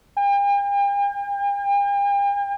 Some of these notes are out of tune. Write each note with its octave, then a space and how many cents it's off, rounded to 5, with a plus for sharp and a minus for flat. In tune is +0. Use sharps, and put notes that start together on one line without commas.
G5 +45